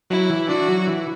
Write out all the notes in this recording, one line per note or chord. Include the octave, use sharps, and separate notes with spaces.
F#3 E4
E3
D4 F#4
F#3
E3